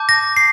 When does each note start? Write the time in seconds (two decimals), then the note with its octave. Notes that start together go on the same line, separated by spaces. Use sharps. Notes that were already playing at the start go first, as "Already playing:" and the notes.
Already playing: A5 D6 G6
0.09 A#6
0.37 C7